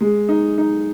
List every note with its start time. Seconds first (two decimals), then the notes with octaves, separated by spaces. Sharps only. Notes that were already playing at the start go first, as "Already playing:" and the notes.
0.01 G#3
0.29 D#4
0.58 D#4